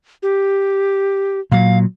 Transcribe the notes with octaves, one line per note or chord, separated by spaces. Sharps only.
G4
A#2 F#3 F5